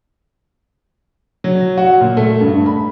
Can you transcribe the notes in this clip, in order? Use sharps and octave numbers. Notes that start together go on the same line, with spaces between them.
F#3
F#4
A#2
A3
G2
B5